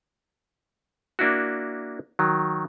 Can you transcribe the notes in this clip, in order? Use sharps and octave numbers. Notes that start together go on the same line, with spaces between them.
A#3 D4 E4 F#4
D#3 F#3